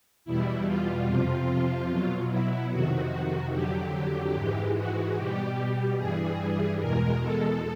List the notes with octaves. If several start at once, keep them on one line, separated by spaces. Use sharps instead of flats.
E2 B2 G3 E4
F4
F2 C3 F3
B2 F#3
E4
F2 C3 D#3 F#4
F2 D3 F#3 G4
G#2 E3 G#3
F#4
B2 G3 G4
G2 E3 G3 G#4
E2 B2 G#3 A#4
A4